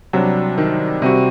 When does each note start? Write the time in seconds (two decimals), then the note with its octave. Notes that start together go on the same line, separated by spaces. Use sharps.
0.13 C3 F#3 G3 D4
0.58 D#3
1.02 C3 G3 C4 F#4